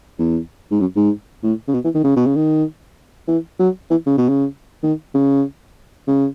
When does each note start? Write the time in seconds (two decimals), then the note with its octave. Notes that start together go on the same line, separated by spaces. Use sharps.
0.19 E2
0.71 G#2
0.80 F#2
0.96 G#2
1.43 A2
1.68 C#3
1.74 B2
1.84 E3
1.95 D#3
2.04 C#3
2.16 B2
2.26 C#3
2.36 D#3
3.28 E3
3.59 F#3
3.91 E3
4.06 C#3
4.18 B2
4.29 C#3
4.83 D#3
5.14 C#3
6.07 C#3